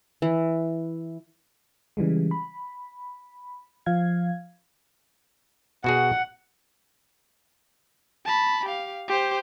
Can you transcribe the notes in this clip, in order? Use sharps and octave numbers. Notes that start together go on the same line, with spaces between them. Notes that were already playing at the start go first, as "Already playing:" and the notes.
E3
C#3 E3 G3 G#3
B5
F3 F5 G#6
B2 F#4 G#4 F#5
A5 B5
G4 F5
G4 C5